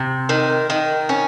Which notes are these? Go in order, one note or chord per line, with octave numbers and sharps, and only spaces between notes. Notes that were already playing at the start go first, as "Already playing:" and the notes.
Already playing: C3
D#3
D#3
C#4